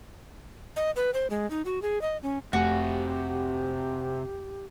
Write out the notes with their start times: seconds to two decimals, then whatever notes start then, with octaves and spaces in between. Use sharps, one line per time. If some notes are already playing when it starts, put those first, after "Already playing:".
0.76 D#5
0.96 B4
1.14 C5
1.30 G#3
1.50 D#4
1.65 F#4
1.82 G#4
2.02 D#5
2.22 C#4
2.53 F1 C3 A3 F#4 G4 G#5